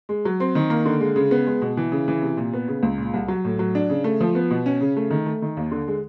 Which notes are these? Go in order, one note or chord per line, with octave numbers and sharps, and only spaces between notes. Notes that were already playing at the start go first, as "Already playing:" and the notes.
G#3
F#3
C4
D#3
A#3
D3
G#3
C#3
B3
G#3
B2
E3
C#3
E3
C3
A#2
B3
C#3
C#2
A#2
C2
F#3
A2
F#3
D4
C#3
A3
F3
B3
B2
C#4
C#3
A3
D#3
A3
D#3
D#2
D3
G#3